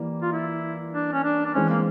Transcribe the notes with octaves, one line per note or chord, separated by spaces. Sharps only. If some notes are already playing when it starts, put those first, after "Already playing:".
Already playing: E3 G3 A#3
F4
E4
D4
C#4
D4
D4
E3 G#3 C4 C#4
A#3